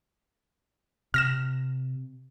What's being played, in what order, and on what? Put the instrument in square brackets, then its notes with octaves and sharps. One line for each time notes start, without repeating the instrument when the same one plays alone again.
[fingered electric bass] C3 [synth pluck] F6 A#6 E7